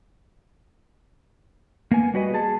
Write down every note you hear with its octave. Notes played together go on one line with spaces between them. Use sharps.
A#3 B3 G#5
G3 F#4 B4 D#5
G#4 A5